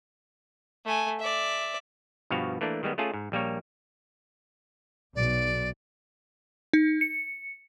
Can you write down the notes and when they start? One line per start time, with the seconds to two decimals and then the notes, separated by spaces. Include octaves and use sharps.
0.86 A3 G#5
1.19 D5 E5
2.30 G2 B2 F3 F#4 F5
2.61 E3 A3 A#3 D4
2.83 D#3 G3 G#3 B3
2.98 A3 C#4 F4 G#4 A5
3.14 G#2
3.32 A#1 G3 A#3 C#5
5.16 B1 D5
6.73 D#4
7.01 C#7